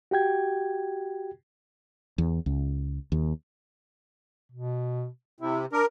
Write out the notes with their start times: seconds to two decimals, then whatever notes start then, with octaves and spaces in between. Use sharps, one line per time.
0.11 F#4 G4 G5 G#6
2.18 E2
2.46 C#2
3.12 D#2
4.52 B2
5.41 C3 E4
5.72 D4 A#4